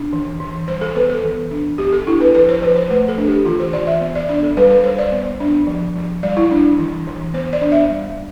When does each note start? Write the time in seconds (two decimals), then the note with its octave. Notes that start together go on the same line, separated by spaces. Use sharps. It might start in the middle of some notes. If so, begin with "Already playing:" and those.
Already playing: D4
0.13 E3
0.40 E3
0.68 G3 C5
0.81 A4
0.95 B3 B4
1.09 A4
1.24 E3
1.51 D4
1.78 B3 G4
1.92 A4
2.06 D4 E4
2.21 B4
2.34 F3 B4
2.49 C5
2.62 F3 B4
2.76 C5
2.90 A3 B4
3.08 A4
3.18 D4
3.27 G4
3.45 E3 F4
3.60 C5
3.73 E3 D5
3.87 E5
4.01 B3
4.15 D5
4.28 D4 D5
4.43 A4
4.57 G3 B4
4.70 B4
4.84 G3 C5
4.98 D5
5.12 B3
5.40 D4
5.67 F3
5.96 F3
6.23 G3 D5
6.37 E4
6.51 D4
6.79 E3
7.07 E3
7.34 B3 C5
7.53 D5
7.61 D4
7.72 E5
7.90 G3